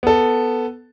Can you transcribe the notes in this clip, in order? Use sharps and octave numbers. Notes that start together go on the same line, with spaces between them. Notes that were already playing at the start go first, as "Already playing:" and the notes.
B3 A4